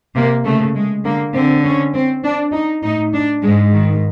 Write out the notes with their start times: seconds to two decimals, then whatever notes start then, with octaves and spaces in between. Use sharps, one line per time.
0.15 C3 A#3
0.45 C#3 A3
0.75 G#3
1.04 D3 A#3
1.34 D3 C4
1.65 C#4
1.94 C4
2.24 D4
2.53 D#4
2.83 A2 D#4
3.14 D4
3.42 G#2 G#3
3.72 D#3